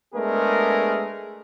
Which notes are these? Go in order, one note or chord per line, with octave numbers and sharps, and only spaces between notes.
G#3 A3 B3 D4 G#4 A#4